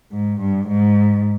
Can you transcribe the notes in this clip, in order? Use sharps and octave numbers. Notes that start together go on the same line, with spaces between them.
G#2
G2
G#2